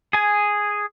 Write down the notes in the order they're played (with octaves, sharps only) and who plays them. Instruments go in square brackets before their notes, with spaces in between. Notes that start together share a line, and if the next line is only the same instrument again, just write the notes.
[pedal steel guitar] G#4 G#5